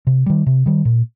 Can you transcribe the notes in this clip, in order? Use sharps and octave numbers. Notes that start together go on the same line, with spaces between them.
C3
D#3 G3
C3
D#3 G3
A#2